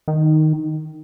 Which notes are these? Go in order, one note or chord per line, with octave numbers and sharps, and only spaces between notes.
D#3